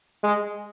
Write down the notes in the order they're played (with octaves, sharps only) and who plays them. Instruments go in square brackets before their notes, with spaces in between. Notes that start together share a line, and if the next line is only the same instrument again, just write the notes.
[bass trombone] G#3